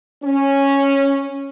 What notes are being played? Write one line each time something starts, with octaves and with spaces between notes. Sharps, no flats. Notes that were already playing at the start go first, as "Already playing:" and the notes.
C#4